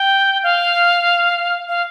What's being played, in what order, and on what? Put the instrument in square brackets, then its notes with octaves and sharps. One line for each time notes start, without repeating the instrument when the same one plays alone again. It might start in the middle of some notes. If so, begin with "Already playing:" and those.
Already playing: [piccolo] G5
F5
F5